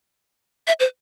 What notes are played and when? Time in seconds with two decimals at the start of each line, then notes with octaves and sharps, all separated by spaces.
0.67 E5
0.80 C5